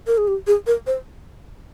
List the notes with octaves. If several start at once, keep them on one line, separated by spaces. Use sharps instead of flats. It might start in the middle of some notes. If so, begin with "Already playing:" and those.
A#4
G#4
G4
G#4
A#4
C5